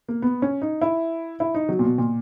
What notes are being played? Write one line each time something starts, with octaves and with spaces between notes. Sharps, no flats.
A#3
B3
C#4
D#4
E4
E4
D#4
F#3
A#2
B2
A#2